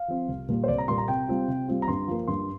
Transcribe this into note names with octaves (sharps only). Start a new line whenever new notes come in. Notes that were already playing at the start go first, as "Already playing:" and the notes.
Already playing: F5
F3 C4
C2
A#2 G3 A#3
C5
C2 D5
A#5
A#2 G3 A#3 C6
A#5
C3 G5
G3 C4 F4
C3
G3 C4 F4
A#5
G2 C6
F3 A#3
G2 C6